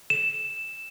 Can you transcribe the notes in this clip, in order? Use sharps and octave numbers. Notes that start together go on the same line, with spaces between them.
E7